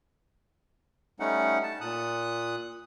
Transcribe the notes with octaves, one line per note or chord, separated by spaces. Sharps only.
G3 A3 C#4 D#4 F#5
A5
A#2 D#6 F#6